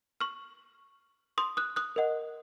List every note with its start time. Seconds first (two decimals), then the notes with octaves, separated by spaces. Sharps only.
0.21 C#6 F6
1.38 C6 D#6
1.57 D#6 F#6
1.76 D#6 F#6
1.96 A#4 D#5 F#5